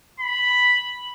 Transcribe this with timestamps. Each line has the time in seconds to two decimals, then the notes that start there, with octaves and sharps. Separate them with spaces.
0.20 B5